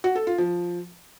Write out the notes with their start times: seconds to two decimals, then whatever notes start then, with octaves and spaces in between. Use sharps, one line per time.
0.04 F#4
0.15 A4
0.27 F4
0.38 F3